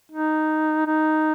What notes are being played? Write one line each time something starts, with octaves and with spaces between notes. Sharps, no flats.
D#4
D#4